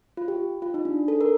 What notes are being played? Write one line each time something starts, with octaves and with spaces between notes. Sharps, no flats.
F4
G4
F4
D#4
D4
A4
A#4